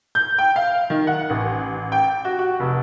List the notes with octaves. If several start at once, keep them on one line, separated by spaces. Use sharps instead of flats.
G6
G5
F5
D#3
F#5
A1
G5
F#4
F#4
F1